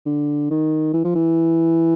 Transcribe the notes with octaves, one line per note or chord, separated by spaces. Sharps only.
D3
D#3
E3
F3
E3